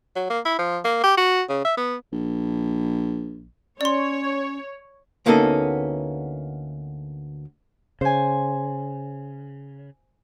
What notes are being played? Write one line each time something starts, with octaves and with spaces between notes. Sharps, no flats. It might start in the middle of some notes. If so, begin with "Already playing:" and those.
F#3
A#3
E4
F3
A#3
G4
F#4
C#3
E5
B3
A#1
C#4 C#5 D5 C6
D2 A#3 B3 C#4 D#4 A4
C#3 C5 G#5